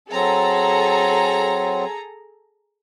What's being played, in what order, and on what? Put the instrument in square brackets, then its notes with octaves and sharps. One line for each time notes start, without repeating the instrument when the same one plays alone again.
[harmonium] F#3 C4 [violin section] G#4 A4 A#5